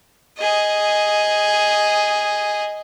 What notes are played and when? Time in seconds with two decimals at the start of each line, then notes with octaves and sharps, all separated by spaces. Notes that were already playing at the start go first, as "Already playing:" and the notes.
0.38 G#4 D#5